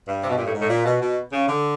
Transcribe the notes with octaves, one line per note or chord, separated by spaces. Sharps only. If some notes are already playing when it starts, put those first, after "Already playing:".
G2
C3
B2
A#2
A2
G#2
A2
A#2
B2
B2
C#3
D3